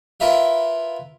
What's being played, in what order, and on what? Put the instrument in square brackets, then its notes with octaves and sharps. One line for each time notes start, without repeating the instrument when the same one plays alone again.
[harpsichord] E4 F4 A#4 B4 E5 F5